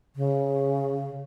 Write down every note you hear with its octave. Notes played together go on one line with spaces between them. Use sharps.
C#3